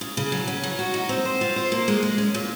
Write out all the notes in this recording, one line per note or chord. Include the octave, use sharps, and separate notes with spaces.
C#3
C#3
F#3
C#4
F#3
F#4
D#4
C4
C5
F4
C5
A#3
G#3
G#3
C#4
A#2